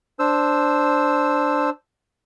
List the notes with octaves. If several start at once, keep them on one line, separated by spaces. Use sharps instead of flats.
D4 C5 E6